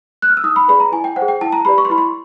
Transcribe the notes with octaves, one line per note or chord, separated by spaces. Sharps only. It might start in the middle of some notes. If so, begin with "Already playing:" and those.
F#6
F6
E6
D#4 D#6
B5
G#4 B4 D5 B5
A#5
E4 G#5
G5
C5 F#5
G#4
G5
E4 A5
A#5
G4 B4 D5 B5
C#6
C6
E4 B5
C6